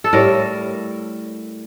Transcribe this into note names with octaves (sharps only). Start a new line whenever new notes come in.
A4
A2 G3 A#4